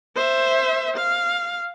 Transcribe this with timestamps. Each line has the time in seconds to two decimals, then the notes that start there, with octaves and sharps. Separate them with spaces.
0.16 C5 E5
0.95 F5